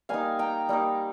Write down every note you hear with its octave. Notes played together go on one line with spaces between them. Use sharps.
G3 A#3 D#4 F5 G#5
G5 A#5
G3 A#3 D#4